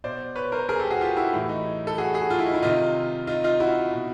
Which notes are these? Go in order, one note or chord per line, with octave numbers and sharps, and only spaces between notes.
B2 C5 D5
B4 C#5
A#4 C5
G#4 A#4
G4 A4
F#4 G#4
F4 G4
E4 F#4
A2 E3 E4
D#4
A4
F#4 G#4
F#4 G#4
F4
E4
D#4
E4
C3 D#3 D#4 F4
D#4 F4
D#4 F4
E4 F#4
B2